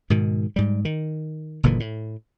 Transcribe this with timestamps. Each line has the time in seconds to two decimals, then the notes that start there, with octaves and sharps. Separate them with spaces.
0.10 G#2 B2 D#3
0.56 G#2 G3
0.85 D#3
1.63 F#1 A#2 D3 E3
1.80 A2